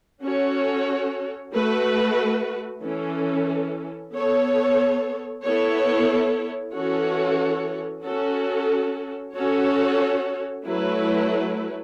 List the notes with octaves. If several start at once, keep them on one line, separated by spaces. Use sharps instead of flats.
C#4 F#4 A4 C#5
A3 F#4 B4
E3 C#4 A4
B3 A4 C#5
B3 E4 A4 C#5
E3 C#4 F#4 A4 C#5
C#4 F#4 A4
C#4 F#4 A4 C#5
F#3 A3 E4 B4